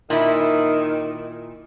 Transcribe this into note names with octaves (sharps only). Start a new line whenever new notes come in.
A#2 D#3 E4